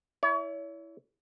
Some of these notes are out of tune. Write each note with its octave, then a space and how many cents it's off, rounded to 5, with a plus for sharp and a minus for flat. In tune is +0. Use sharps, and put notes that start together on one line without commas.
E4 +0 C#5 +40